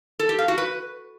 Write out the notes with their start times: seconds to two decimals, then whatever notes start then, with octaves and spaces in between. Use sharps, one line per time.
0.19 A4
0.29 G4
0.39 F5
0.48 F#4
0.58 B4